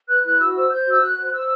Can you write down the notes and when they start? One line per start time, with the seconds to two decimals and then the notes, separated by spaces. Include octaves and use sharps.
0.08 B4 F#6
0.24 E4 F#6
0.40 F#4 E6
0.55 C5 E6
0.71 C5 G6
0.87 F#4 E6
1.02 F#4 F#6
1.18 C5
1.33 C5 E6